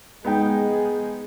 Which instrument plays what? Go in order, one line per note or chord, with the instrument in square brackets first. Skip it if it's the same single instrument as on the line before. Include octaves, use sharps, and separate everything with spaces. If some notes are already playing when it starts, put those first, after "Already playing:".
[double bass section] G#3 [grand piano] B3 D#4 G5 [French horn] G#4